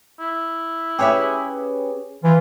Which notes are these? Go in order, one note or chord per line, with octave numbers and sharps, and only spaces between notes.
E4
C#4 G4 G#4 B4 C#5 E5
E3 F4